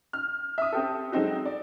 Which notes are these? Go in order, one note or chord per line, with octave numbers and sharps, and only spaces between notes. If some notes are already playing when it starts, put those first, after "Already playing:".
F6
E5 D#6
C4 G4 A4
F#3 G#3 C4 D#4 F#4
D5